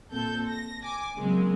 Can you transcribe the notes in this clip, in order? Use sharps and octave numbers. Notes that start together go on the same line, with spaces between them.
A#2 C4 A4 G6
A#6
G#5 D6
C#3 F#3 G#3 A#3 C4